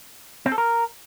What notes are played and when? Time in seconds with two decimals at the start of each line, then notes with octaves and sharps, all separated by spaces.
0.46 C4
0.52 A4
0.58 A#4